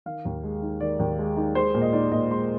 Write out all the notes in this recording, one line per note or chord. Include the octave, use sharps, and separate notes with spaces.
D#3 F5
D#2
G#3
D#4
D#3 D5
D#2
G#3
D#4
G#3 C5
A#2
D#5
D#4 D5
A#2 D#5
G#3 C6